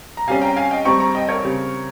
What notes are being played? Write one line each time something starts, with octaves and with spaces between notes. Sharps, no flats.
A#5
C3 G3 C#4 F5 G#5
G5 A#5
F5 G#5
D#5 G5
G2 G3 C4 A#5 C#6
A#5 C#6
D#5 G5
A#4 C#5
C#3 G3 C4